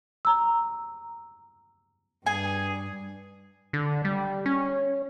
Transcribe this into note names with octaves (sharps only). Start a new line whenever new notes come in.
A#5 E6
G2 G#4 G#5
D3
G3
C#4